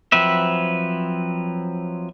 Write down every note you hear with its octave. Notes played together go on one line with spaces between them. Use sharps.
F3 F#3 C4 B4 E5